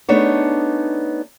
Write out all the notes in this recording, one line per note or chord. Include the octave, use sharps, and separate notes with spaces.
A3 B3 D4 D#4 G#4 C#5